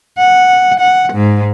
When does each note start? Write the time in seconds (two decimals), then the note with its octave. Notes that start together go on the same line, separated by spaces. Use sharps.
0.18 F#5
0.79 F#5
1.12 G#2